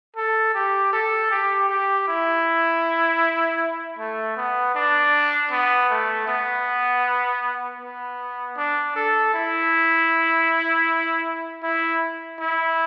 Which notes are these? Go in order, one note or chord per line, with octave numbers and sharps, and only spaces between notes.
A4
G4
A4
G4
G4
E4
A3
B3
D4
B3
A3
B3
B3
D4
A4
E4
E4
E4